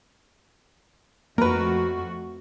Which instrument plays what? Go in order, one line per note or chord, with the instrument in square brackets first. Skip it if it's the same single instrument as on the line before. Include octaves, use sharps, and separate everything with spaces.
[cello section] F2 A3 F#4 [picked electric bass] A#3 [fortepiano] A#4 B4